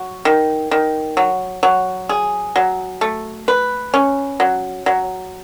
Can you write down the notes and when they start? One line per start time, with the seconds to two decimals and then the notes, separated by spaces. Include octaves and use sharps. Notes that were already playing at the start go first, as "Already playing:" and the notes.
Already playing: F#3
0.25 D#3
0.71 D#3
1.17 F#3
1.63 F#3
2.09 G#4
2.56 F#3
3.01 A3
3.48 B4
3.94 C#4
4.40 F#3
4.86 F#3